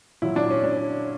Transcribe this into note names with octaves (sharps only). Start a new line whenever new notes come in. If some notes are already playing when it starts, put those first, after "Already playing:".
A#2 F#3 E4
D4
C#4
D4